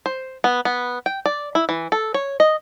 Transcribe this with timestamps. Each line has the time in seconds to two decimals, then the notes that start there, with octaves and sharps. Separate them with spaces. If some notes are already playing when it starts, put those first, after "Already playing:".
0.06 C5
0.44 B3
0.65 B3
1.06 G5
1.26 D5
1.55 E4
1.69 E3
1.92 A4
2.14 C#5
2.40 D#5